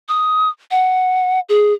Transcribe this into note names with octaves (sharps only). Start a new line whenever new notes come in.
D#6
F#5
G#4